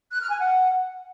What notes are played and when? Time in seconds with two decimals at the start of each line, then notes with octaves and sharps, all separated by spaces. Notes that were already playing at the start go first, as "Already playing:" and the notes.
0.11 F#6
0.21 F6
0.30 G#5
0.39 F#5